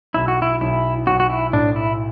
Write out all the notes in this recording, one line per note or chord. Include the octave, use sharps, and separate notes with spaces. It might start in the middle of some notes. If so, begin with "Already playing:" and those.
B1 E4
F#4
E4
B1 E4
B1 F#4
F#4
E4
A2 D4
E4